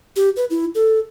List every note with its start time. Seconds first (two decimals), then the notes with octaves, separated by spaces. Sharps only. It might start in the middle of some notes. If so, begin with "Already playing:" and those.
0.16 G4
0.36 B4
0.50 E4
0.75 A4